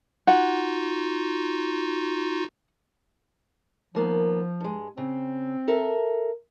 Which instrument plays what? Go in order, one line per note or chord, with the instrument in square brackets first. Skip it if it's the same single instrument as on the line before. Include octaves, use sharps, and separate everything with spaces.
[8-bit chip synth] D#4 F4 F#4 [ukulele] F#5
[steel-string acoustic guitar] D#2 A#3 B3 [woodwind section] F3
[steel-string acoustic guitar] G2 G#3
[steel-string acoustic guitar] C#3 [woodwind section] C4
[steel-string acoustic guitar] A4 A#4 E5